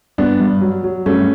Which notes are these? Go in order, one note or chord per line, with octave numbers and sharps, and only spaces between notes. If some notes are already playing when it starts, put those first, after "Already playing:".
G2 B3 D4
G2
F#3
F#3
G2 A3 C#4